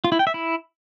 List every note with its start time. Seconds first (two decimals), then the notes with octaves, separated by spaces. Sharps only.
0.04 F4
0.12 E4
0.19 G5
0.27 E5
0.34 E4